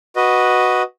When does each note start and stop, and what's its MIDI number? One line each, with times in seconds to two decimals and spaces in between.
0.16 0.82 66
0.16 0.82 71
0.16 0.82 75